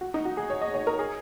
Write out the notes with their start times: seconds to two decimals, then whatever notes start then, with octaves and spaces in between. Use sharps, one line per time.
0.01 F#4
0.14 D#4
0.25 F#4
0.37 G#4
0.50 C#5
0.61 D#5
0.74 C#5
0.87 A#4
0.99 G#4